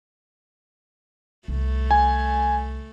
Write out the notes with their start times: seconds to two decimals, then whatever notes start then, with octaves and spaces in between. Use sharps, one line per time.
1.48 C2 A3
1.91 G#5